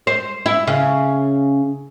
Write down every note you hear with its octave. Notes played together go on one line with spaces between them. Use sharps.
C5
E4
C#3